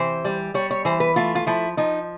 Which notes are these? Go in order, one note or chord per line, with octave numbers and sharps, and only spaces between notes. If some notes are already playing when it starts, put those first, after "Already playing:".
Already playing: C3 E3 C5
G3
G3 C#5
C#5
E3 C5
B4
A3 F4
F4
F3 E4
F3 D#4